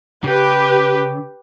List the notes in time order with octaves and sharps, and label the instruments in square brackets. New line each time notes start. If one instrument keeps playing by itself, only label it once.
[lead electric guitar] C#3 [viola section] G4 B4